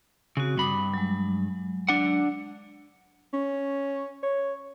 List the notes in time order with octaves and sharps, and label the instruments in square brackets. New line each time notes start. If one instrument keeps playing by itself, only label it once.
[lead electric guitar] C#3 [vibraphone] C4 F#4
[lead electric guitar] G2 B5 [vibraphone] D6 D#6
[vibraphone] F#3 G#3
[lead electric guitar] D4 F#5
[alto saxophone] C#4
C#5